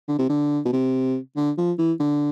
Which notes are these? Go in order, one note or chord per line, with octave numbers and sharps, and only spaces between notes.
D3
C3
D3
B2
C3
D3
F3
E3
D3